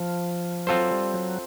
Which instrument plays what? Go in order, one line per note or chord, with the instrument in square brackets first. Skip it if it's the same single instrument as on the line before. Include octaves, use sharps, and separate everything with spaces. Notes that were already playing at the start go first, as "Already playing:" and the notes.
Already playing: [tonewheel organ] F3
[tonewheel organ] F#3 [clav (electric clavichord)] C4 F4 A4 C5
[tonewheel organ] G3
F#3